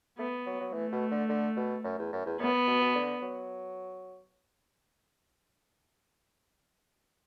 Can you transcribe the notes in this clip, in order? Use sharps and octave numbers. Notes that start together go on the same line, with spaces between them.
A3 B3
F#3
F#3
E3 A3
B2
D3
D3
B2
F#2
E2
F#2
E2
F#2 B3
B2
B2
D3
F#3